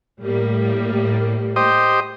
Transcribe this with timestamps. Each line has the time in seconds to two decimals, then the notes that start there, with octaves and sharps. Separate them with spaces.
0.22 A2 G3 A#3
1.56 G4 C5 D#5